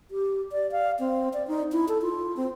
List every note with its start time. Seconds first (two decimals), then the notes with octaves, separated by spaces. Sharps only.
0.11 G4
0.52 D5
0.72 F5
0.99 C4
1.34 D5
1.48 D#4
1.72 E4
1.89 A4
2.02 F4
2.37 C4